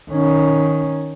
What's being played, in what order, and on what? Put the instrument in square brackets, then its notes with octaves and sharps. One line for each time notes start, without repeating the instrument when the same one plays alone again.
[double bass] D#3 C#4